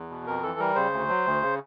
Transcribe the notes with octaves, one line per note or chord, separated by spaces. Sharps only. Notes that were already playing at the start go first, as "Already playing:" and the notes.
Already playing: E2
B2
F2 A#4
E3 A4
G3 A#4
C#3 C5
D2
F#3
D2
C#3